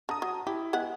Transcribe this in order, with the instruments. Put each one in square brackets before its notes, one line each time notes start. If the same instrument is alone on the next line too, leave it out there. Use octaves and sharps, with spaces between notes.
[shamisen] D3 [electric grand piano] A5 A#5 D#6
[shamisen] F#3
[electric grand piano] E4 [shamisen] G4
[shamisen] G#3 B3 F#5